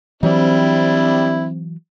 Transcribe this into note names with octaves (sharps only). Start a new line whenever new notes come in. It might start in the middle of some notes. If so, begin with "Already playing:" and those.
E3 F#3 G3 C4 D4 E4